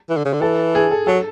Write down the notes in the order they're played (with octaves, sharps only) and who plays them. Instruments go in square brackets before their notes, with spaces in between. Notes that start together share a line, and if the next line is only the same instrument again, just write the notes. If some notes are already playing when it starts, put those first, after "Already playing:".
[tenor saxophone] E3
D3
C#3
D3
[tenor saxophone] E3 [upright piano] A4
[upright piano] G#4
A4
[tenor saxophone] F#3 [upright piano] A4